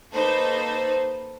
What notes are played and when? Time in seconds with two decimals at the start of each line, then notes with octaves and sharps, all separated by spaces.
0.13 A#3 D#4 A4 B4 C5